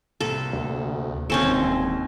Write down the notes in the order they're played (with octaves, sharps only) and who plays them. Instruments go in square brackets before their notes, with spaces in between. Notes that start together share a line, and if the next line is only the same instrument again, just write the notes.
[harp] C2 A2 A#3 [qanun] A4
[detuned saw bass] D2
[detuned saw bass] E1 [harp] D#2 C#7 D#7 [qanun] C4 C#4 A4